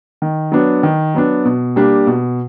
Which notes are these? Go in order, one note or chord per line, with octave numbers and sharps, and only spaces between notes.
D#3
F#3 B3 D4
D#3
F#3 B3 D4
B2
G3 A#3 D4 G4
B2